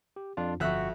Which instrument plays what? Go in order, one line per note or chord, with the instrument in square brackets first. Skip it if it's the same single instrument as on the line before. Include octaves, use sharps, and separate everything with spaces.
[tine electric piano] G4
F2 D4 F4
[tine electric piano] G1 F#4 [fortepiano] F2 E5 F#6